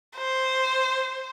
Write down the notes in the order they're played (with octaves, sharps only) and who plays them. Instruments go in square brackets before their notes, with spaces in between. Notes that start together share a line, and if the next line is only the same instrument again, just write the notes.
[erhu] C5